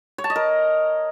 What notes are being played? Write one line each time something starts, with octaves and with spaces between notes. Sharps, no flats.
C#5
A5
D#5
A#4